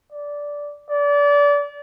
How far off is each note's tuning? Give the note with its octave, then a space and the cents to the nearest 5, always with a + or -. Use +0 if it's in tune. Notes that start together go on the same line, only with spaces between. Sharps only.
D5 -10
D5 -30